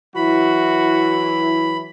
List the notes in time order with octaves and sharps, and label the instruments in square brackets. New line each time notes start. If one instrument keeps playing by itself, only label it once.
[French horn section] E3 F#3 E4 [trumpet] F#4 [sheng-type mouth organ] B5